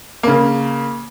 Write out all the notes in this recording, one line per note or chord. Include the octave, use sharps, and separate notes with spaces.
C#3 A#3